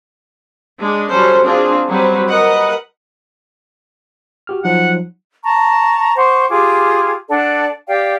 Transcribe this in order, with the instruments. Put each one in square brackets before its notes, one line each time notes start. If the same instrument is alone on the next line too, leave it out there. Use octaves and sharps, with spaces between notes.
[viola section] G#3 D4
F#3 G3 C#4 A4 C5
C4 D4 F4 G#4
F#3 G3 C4 B4
A#4 B4 D#5 F#5
[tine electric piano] F#4 G4 F6
[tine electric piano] F3 F#3 D#4 [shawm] F#5
[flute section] A5 A#5 C#6
C5 F#5 C#6 D6
F4 G4 G#4 D6
D4 A4 D5 F#5
G4 D5 F5 G5